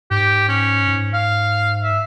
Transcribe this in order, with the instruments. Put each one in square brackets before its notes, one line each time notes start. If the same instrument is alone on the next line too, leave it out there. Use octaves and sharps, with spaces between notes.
[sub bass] G#2 [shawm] G4
[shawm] C#4
[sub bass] G#2
[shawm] F5
E5